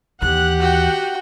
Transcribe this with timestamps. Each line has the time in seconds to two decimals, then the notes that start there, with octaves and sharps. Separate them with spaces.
0.22 D#2 E3 G4 F#5 F#6
0.60 F#4 G5